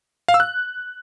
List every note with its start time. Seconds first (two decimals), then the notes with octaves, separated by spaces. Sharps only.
0.28 F5
0.34 E6
0.40 F#6